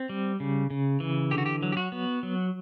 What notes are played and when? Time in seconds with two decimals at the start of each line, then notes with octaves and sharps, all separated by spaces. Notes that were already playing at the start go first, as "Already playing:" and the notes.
Already playing: C4
0.09 G3
0.40 C#3
0.70 C#3
1.00 E3
1.31 D3 G4
1.38 F#4
1.46 G4
1.63 F#3
1.72 G4
1.77 F#4
1.92 B3
2.23 F#3